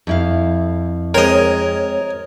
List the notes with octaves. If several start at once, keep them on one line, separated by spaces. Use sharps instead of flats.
F2 E4 F5
G#3 C4 A#4 C#5 D#5